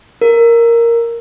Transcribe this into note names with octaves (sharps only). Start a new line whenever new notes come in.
A#4